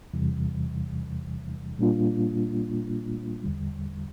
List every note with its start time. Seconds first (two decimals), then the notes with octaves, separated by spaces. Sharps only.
0.14 E2 C3 E3 G3
1.78 A#2 G3 A#3 D4 F4
3.43 E2 D3 G3